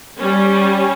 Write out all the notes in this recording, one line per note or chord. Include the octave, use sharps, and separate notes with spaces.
G3 C#4